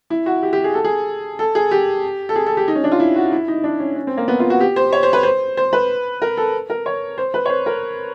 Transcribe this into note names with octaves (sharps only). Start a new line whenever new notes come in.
E4
F#4
G4
G4
G#4
A4
G#4
A4
G#4
G4
A4
G#4
A4
G4
D#4
C#4
D4
F4
E4
F#4
E4
D#4
D4
C#4
C#4
C4
A#3
B3
F4
F#4
G4
C5
C#5
C5
B4
C5
C5
B4
A#4
A4
A#4
C#5
C5
B4
C#5
C5
A#4